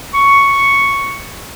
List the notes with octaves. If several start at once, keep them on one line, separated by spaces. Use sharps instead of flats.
C#6